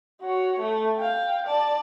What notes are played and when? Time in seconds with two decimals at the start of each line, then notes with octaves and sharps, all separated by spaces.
0.21 F#4 C#5
0.59 A3
0.96 F5 G5
1.47 D5 A5